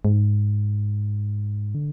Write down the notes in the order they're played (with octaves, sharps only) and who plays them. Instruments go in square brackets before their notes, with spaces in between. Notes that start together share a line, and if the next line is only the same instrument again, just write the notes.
[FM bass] G#2
D3